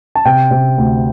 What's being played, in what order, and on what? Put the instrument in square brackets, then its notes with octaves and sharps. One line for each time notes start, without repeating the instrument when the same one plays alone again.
[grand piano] A5
C3 G5
C3
D2